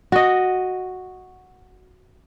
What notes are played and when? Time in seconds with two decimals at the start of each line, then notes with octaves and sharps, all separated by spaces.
0.12 F#4 D#5